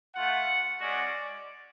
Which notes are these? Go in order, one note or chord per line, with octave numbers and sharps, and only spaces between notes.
A3 F4 F#5
G#3 C#4 F#4 D5